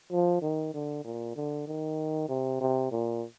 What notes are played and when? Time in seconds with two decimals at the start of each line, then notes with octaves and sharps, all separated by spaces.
0.12 F3
0.42 D#3
0.74 D3
1.04 A#2
1.36 D3
1.67 D#3
2.29 C3
2.60 C3
2.91 A#2